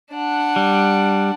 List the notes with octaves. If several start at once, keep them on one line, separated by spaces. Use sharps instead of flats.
D4 F#5
G3